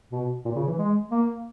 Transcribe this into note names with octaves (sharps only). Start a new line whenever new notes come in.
B2
A#2
C#3
E3
G#3
A#3